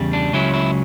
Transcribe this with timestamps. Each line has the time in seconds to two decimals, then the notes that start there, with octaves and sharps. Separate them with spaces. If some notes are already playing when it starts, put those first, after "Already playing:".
Already playing: E2 C#3 G3
0.13 D4
0.33 C#2 C#3 F#3 C#4 E4
0.54 E4